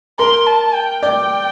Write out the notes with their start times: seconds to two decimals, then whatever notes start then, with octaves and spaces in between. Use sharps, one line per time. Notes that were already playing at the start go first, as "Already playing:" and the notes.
0.19 A#4 C6
0.47 A5
0.74 G5
1.03 D5